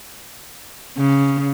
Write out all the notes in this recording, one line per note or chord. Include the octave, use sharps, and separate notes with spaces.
C#3